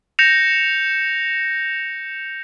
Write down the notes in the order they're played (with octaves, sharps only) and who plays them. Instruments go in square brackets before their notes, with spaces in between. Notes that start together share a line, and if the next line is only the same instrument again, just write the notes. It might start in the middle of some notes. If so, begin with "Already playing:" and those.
[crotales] G6 A#6 C#7 E7 F7